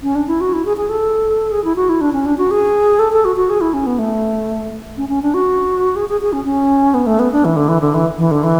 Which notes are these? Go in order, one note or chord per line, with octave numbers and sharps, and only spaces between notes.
C#4
D4
E4
F#4
E4
G#4
G#4
A4
G#4
E4
F#4
E4
D4
C#4
D4
F#4
G#4
A4
A4
F#4
F#4
G#4
E4
C#4
B3
A3
C#4
C#4
D4
F#4
G#4
G#4
G#4
C#4
C#4
B3
A3
B3
D4
E3
D3
E3
D3
E3
E3
D3
E3